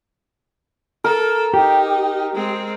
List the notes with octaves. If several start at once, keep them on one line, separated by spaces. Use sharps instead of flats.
A4 A#4
D#4 G4
G#3 C4